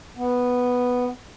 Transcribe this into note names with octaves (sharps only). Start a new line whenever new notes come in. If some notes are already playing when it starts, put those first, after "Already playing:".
B3